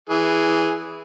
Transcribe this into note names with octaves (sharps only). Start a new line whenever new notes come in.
E3 G#4